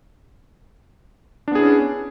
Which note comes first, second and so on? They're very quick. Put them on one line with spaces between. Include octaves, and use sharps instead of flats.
D4 B3 G#4 E4 C#4